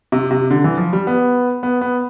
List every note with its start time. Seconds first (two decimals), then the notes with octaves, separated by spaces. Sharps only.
0.12 C3
0.31 C3
0.51 D3
0.64 E3
0.78 F3
0.93 G3
1.07 B3
1.63 B3
1.81 B3